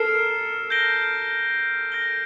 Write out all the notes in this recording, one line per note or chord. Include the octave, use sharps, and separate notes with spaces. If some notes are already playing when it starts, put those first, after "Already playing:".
Already playing: A4 A#4 F6 C7 E7
G6 A#6 D7 G7
G6 A#6 D7 G7